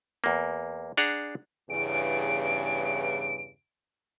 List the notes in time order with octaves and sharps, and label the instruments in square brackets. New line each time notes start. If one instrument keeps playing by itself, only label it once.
[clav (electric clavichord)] E2 A#3
D4 G#4 F#5 A#5
[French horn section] E2 G2 C#3 [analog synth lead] D7